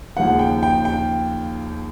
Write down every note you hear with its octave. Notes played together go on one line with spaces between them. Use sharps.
D#2 C#3 F3 F#5
G5
G5
G5